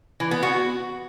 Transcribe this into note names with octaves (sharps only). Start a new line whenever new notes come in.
E3
B3
F#4